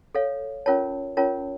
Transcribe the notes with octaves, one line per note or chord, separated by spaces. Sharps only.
A4 C#5 F5
C#4 F4 A#4 C#5 A5
C#4 F4 A#4 C#5 A5